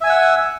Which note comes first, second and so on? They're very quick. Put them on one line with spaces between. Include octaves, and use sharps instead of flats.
E5 G#5 E6 F#5